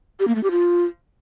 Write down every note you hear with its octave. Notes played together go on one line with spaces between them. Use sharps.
G4
A#3
A3
G4
F4